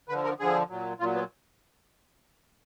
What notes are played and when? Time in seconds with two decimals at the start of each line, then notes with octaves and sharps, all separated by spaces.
0.09 D3 F3 B4
0.24 A#4
0.39 D3 F3 G#4
0.69 A#2 F#3
1.00 A#2 F#3 F4
1.15 B3